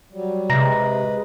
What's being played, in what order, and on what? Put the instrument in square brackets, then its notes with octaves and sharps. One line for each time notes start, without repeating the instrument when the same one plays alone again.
[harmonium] F#3 G3
[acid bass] C3 [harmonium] G#3 B4 D#5 [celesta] A#5 A#6